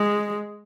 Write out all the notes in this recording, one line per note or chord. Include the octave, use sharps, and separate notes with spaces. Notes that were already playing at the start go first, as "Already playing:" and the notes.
Already playing: G#3